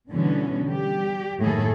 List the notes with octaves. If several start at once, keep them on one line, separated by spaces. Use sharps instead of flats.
B2 D3 E3 G3 B3 C#4
G3 G4
F#2 A2 D#3 A#3 G#4 A4